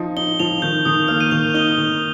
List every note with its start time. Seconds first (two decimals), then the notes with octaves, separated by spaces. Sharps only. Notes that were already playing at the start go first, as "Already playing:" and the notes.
Already playing: F3 D#4
0.17 D#4 G7
0.40 F3 F7
0.62 D#3 G6
0.85 D#3 D#6
1.08 A#3 F6
1.20 D#7
1.31 D#3 F7
1.54 D#4 G7
1.78 D#3